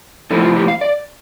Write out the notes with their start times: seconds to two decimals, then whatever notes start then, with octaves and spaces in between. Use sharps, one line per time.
0.30 A2 F3 C4 E4 A4
0.42 F4
0.56 G4
0.68 F5
0.81 D5